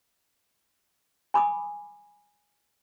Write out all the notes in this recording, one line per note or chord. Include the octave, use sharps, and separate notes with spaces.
G#5 B5 D6 D#6